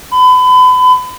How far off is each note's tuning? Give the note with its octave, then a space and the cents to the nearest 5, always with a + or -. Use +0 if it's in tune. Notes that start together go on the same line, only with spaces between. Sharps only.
B5 +35